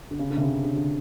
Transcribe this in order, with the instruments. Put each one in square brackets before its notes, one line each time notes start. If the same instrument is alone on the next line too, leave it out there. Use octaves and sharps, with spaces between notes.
[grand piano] D3
C#3
D3
C3
C#3
D3
D3